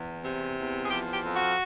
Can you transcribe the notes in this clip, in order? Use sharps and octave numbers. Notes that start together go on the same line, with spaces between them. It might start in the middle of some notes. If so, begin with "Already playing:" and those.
Already playing: E2
C3
E2
G#4
F3 G4
G4
F2
F#4